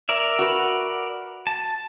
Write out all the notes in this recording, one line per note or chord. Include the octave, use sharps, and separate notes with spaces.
A#4 D5 E5
F#4 B4
A5